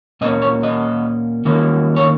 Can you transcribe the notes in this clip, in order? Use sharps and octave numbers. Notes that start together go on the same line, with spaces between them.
A#2 A#3 C#4 D#5
C#5
D#5
D#3 A#3 C#4
C#5